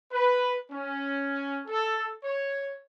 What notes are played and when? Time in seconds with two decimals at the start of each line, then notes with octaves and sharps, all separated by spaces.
0.12 B4
0.72 C#4
1.68 A4
2.24 C#5